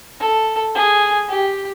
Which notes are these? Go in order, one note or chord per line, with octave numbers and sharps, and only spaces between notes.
A4
G#4
G4